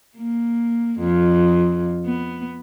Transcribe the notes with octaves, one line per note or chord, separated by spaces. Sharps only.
A#3
F2
B3